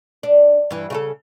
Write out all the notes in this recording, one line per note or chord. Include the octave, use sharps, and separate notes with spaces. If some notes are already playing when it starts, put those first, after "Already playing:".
D4
G2 E3
C#3 F4 A4